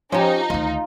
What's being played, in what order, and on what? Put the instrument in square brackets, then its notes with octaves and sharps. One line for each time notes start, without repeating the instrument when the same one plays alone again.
[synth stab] F3 [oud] C#4 G4 [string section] D#4
[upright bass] D2 D#3 [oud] F4